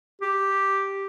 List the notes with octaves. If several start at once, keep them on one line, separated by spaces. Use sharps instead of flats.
G4